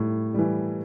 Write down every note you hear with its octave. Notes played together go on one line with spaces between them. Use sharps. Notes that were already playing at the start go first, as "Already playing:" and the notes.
Already playing: A2 G3
E3 G3